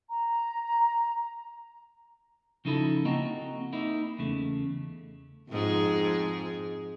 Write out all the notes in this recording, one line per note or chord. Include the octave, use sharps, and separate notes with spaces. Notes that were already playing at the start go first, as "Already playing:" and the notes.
A#5
C#3 F3 D#4 E4 A4 B5
A#3 C4 E4 F#4 D#5 A#5
A#3 D#4 E4 A#4
E2 C#3 A3
F2 G#2 G#4